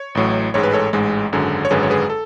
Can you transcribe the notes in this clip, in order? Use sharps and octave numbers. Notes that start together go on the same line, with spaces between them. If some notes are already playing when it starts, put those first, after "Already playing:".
Already playing: C#5
A1 A2 F#3
A1 G#2 G#3 C#5
B4
A4 C#5
A1 G#2 G#3
G#1 F#2 D3 G#3
C#5
G#1 F#2 D3 G#3 G#4 B4
C#5
G#4 B4
A4